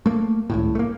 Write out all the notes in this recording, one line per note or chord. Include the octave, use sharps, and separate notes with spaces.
A3 A#3
G#1 C#2 A2
A3 A#3